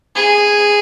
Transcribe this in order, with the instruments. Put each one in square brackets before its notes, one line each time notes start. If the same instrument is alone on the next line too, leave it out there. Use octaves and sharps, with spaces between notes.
[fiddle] G#4